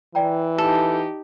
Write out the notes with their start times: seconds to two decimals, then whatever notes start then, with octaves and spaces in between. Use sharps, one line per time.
0.15 E3 D5 G5 A#5
0.58 D#4 G4 A4